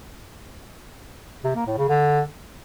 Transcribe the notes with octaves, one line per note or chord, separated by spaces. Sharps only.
C3
A#3
A2
C#3
D3